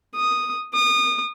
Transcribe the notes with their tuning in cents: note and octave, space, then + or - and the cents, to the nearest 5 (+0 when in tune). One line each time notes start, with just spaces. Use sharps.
D#6 -5
D#6 -30